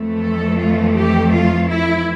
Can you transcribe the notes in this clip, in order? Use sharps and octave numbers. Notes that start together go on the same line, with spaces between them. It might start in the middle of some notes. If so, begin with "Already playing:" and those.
Already playing: F2 E3 A3
A4
F4
G4
F4
E4